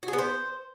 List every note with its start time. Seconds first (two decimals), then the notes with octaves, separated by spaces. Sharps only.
0.03 F#4
0.08 G#4
0.13 B3
0.18 C5